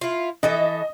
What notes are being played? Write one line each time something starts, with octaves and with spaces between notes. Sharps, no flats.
E4 F4
E3 A4 D#5 E5